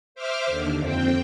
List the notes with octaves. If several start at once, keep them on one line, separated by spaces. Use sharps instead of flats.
C5 E5 D6 F6
D#2 D3
F2 C4 G5